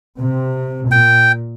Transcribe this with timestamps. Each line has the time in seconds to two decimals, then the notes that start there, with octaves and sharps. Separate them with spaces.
0.19 C3
0.91 A#2 G5